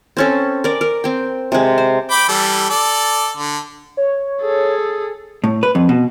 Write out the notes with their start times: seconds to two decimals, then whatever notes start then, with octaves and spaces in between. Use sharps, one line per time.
0.17 C4 C#4 A4
0.64 A#4 D5
0.81 A#4
1.04 C4 G5
1.52 C3 G#3
1.78 C5
2.11 G5 B5 D6
2.29 E3 G3 A4
2.69 A4 D5
3.37 D3
3.97 C#5
4.42 G#4 A4
5.44 A2
5.63 B4
5.75 F2
5.89 B2